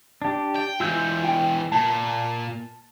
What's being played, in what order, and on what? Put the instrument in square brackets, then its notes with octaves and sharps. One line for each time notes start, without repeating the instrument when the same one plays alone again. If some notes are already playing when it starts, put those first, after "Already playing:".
[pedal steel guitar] D4 G4
[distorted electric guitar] G5
[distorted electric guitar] E3 G#3 [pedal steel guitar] F4 E6 G6
[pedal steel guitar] G5
[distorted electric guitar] A#2 [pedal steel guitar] A5